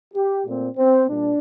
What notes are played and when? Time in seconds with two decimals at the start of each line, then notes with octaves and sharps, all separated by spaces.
0.14 G4
0.46 A#2 A3 C4
0.76 C4
1.08 A#2 G3 D4